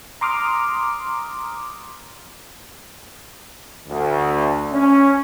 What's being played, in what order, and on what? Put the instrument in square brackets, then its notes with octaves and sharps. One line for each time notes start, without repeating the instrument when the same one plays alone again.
[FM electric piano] A#5 C6 D6 D#6 F6
[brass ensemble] D2
C#4